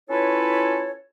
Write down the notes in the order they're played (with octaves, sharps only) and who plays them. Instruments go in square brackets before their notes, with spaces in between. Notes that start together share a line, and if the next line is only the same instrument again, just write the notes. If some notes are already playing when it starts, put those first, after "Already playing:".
[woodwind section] C#4 E4 F4 A4 B4 C#5